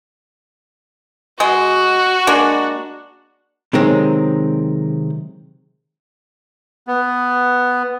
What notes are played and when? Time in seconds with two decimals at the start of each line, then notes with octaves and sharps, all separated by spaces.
1.40 G#3 F#4 G#4 D#5
2.27 G#3 A#3 D4
3.73 C3 D#3 F#3 G#3 C4
6.87 B3